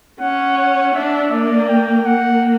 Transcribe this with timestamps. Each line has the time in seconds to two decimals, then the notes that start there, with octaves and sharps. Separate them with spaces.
0.20 C#4 F#5
0.58 F#5
0.95 D4 E5
1.31 A#3 D5
1.69 G5
2.05 A#3 F#5